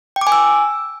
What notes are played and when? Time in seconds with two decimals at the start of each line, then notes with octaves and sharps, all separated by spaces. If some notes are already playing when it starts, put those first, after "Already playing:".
0.16 G5
0.21 D6
0.27 G#5
0.32 E6